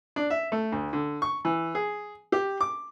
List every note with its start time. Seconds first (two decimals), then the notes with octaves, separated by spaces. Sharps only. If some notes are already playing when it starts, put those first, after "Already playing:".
0.16 D4
0.30 E5
0.52 A3
0.72 D2
0.93 D3
1.22 C#6
1.45 E3
1.75 G#4
2.32 G4
2.61 D6